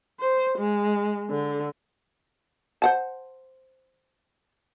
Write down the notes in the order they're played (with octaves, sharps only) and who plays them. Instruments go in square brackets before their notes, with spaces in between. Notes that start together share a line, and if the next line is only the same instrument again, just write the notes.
[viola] C5
G#3
D3
[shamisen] C5 F#5 A5